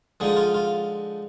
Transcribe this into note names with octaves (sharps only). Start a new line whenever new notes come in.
D3 F3 G#3 D#4 G#4
F4
F4